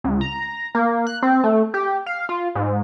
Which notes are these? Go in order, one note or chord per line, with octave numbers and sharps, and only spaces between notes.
C#2
A#5
A#3
F#6
C4
A3
G4
F5
F4
G#2